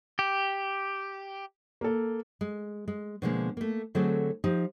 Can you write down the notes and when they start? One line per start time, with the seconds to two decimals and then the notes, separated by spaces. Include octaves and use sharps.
0.19 G4
1.81 A#3 A4
2.41 G#3
2.88 G#3
3.22 B2 D3 F3 G3 G#3 A#3
3.57 A3 A#3
3.95 D3 F#3 A3 C4 F#4 G#4
4.44 F3 D#4 G4